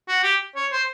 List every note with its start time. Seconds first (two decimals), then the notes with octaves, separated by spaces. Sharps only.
0.09 F#4
0.24 G4
0.56 C#5
0.72 C5